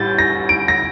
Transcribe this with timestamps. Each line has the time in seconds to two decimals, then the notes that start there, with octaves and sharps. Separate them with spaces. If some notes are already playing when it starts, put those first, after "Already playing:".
Already playing: A1 A2 G3 G6 A6
0.19 A#6
0.49 D7
0.68 A#6